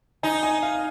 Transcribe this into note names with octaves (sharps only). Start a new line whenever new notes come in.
D#4 G#5
G#5
F5